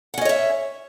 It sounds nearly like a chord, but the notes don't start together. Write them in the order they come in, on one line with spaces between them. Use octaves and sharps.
F#5 C#4 D#5 C#5 E5